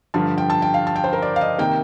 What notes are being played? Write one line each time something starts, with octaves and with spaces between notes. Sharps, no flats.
G2 D3 F3 A5
G5
A5
G5
F5
A5
G5
C5
A#4
D5
F5
D#5
C3 D#3 A#3 G5